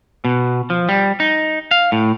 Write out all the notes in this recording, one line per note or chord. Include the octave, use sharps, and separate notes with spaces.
B2
F3
G3
D#4
F5
A2